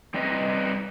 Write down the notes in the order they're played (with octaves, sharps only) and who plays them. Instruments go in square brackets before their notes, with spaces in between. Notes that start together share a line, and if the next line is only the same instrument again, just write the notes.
[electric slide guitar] G3 C4 D#4 B4 D#5